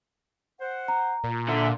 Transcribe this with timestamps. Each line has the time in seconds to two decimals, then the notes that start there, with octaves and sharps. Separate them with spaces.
0.61 C5 F#5
0.88 A#5
1.24 A#2
1.49 D3 A4 E5